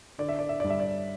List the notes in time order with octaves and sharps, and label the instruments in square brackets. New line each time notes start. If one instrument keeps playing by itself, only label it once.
[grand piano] D3 D5
E5
D5
E5
G2 D5
E5
D5